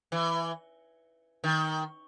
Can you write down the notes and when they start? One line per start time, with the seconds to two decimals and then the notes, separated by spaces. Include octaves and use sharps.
0.12 E3
1.44 D#3